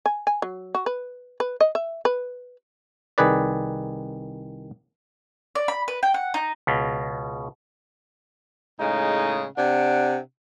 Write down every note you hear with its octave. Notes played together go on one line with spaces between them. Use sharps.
G#5
G#5
F#3
F#4
B4
B4
D#5
E5
B4
C2 D#3 G#4 B4 D5
D5
B5
B4
G5
F#5
D#4
C#2 B2
A2 C#3 G#3 D#4
C3 D4 F#5